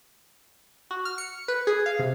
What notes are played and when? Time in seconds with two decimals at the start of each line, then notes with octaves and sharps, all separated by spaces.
0.91 F#4
1.05 F6
1.18 C#7
1.48 B4
1.67 G#4
1.86 F5
1.99 C3